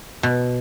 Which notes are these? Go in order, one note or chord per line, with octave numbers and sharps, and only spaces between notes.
B2